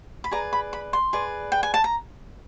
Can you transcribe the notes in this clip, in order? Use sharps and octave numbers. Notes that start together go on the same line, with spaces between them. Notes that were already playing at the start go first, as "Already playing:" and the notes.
B5
G#4 B4 D5 A#5
B5
B5
C6
G#4 B4 D5
G5
G#5
A5
A#5